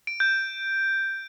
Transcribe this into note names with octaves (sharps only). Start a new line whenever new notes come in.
D7
G6